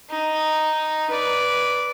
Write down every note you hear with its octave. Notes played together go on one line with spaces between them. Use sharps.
D#4
B4 D5